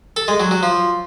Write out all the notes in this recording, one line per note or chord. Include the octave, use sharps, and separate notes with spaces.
A4
G#3
F#3
F#3
F3